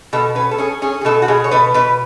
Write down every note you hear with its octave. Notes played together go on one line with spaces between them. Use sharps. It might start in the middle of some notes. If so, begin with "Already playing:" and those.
B2 A4
C#4 B4
A4
C#4 G#4
C#4 G#4
G#4
B2 A4
F#4
B2 G#4
C#5
B2 B4
B2 B4